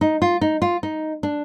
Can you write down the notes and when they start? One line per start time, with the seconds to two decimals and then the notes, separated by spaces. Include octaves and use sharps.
0.01 D#4
0.22 F4
0.41 D#4
0.62 F4
0.83 D#4
1.23 D4